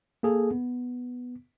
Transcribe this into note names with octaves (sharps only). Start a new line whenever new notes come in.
A#3 G#4 A4
B3